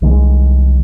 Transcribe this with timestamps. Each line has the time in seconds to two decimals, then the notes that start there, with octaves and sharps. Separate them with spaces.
0.02 C2 D#3 F#3 G#3